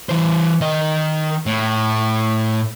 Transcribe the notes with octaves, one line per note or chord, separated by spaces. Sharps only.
E3 C5
D#3 D#5
A2